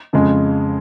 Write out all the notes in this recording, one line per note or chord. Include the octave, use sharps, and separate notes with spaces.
F2 C#3 G#3